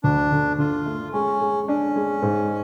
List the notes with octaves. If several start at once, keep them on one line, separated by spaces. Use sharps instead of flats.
D2 D4
D3
D3 F4
A3
G#3 C#4
G#3
C#4 D4
G#3
G#2